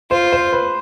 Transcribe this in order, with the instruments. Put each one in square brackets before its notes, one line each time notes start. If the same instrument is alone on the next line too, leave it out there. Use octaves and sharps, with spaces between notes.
[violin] F4 [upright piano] C5
[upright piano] C5
B4